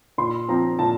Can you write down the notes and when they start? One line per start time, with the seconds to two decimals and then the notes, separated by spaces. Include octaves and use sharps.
0.18 A#2 C6
0.49 F3 C4 A#5
0.79 A#2 A5